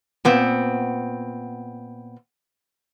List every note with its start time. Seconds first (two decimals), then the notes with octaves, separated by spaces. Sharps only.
0.25 A#2 B3 C4